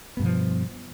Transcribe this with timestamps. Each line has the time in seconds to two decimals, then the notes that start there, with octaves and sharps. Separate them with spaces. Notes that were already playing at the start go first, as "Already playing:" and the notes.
0.17 B3
0.19 G2
0.22 B2
0.25 F3